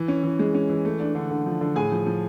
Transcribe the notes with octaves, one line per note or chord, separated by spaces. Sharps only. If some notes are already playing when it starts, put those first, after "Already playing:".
Already playing: E3
C#4
E3
G#3
C#4
E3
A3
D4
D3
D3
F3
D3
A2 G#4 G#5
F3
F3